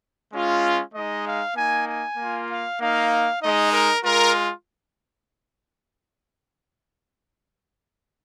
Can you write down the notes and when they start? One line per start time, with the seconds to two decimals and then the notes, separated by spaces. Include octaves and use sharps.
0.33 G#3 C#4 F4
0.94 G#3 D#4 D#5
1.26 F5
1.56 A#3 D#4 G#5
1.87 G#5
2.17 A#3 F4
2.49 F5
2.80 A#3 D#4 F5
3.41 G#3 D#4 D#5
3.72 A#4
4.03 G#3 F4 A#4